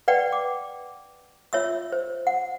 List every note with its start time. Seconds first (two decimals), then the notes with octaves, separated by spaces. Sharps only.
0.08 B4 D5 F#5 G5
0.32 D6
1.53 F4 C#5 E5 E6
1.92 C5
2.27 F#5